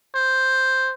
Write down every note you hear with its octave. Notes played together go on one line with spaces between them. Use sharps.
C5